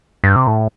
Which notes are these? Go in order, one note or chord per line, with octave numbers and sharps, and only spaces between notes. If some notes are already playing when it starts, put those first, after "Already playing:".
G2
C3
A2